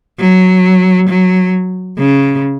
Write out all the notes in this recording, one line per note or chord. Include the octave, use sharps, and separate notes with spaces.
F#3
F#3
C#3